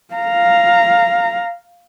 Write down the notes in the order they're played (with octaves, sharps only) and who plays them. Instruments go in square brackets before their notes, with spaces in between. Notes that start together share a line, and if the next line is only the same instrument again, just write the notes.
[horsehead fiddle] F5 A#5